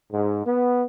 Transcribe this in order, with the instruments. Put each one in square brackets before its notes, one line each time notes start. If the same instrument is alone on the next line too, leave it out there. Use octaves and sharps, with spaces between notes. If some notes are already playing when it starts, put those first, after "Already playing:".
[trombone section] G#2
B3